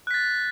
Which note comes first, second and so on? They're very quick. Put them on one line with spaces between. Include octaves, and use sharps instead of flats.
F#6 B6 A6